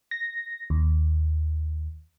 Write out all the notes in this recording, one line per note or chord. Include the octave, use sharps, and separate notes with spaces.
A#6
D#2